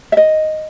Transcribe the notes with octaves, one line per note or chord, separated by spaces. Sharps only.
E5
D#5